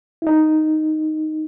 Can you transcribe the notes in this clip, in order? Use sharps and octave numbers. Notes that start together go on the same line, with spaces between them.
E4
D#4